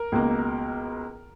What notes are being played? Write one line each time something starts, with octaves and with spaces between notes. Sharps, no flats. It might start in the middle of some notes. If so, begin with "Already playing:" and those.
Already playing: A#4
C#2 B2 A#3